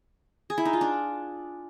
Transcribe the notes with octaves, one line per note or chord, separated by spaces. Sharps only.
G#4
E4
D#4
F4
D4